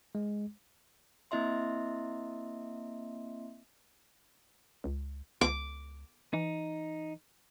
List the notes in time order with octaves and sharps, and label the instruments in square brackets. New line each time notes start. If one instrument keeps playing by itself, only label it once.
[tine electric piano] G#3
[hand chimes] A#3 C4 E4 D#5 E5 C6
[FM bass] C#2
[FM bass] C#2 [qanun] D6
[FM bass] E3 [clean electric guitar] D#4